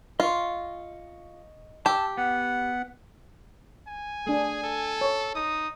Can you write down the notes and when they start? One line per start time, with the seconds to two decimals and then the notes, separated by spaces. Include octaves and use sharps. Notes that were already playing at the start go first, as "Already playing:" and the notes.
0.20 F4 D#5 C#6
1.86 G4 A5 E6
2.17 B3 F#5
3.88 G#5
4.27 A3 D4 G#4
4.64 A4
5.01 C#5
5.35 D#4 D#6